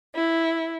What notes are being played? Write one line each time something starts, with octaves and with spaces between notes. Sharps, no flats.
E4